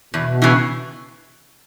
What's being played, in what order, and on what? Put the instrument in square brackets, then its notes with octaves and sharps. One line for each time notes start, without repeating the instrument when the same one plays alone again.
[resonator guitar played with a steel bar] E2 [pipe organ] B2
[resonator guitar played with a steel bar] C#3 E3